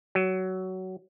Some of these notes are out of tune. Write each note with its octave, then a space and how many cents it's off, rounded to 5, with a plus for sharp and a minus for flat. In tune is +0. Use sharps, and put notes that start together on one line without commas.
F#3 +15